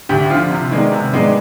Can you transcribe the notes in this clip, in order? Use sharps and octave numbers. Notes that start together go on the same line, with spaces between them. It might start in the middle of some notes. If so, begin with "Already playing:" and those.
D2 G4
D3 F3 F4
C3
D#3 G#3 B3 D4
C3
D#3 G#3 B3 D4